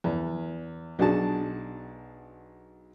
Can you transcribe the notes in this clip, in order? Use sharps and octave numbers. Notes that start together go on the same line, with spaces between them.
E2
B1 D4 F#4 G#4 A5